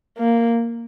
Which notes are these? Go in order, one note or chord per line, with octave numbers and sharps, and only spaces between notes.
A#3